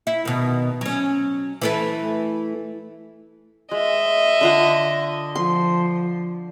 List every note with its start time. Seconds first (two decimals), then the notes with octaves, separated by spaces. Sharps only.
0.07 E4
0.25 B2 D#3
0.81 F#3 C#4
1.62 E3 A3 B4
3.71 G#3 D#5 E5
4.41 D3 F4 F#5
5.35 F3 C6